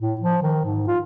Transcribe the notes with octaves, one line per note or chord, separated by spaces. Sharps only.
A2
F3
D#3
G#2
F4